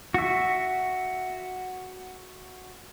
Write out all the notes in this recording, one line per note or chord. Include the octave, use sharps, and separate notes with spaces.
F#4 E5